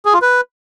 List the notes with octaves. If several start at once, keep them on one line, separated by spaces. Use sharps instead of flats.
G#4
F4
B4